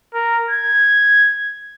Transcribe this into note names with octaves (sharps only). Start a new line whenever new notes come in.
A#4
G#6